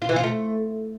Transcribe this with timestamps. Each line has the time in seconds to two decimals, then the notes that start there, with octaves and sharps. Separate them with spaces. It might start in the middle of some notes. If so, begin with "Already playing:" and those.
0.02 F4
0.09 E3
0.16 F4
0.24 A3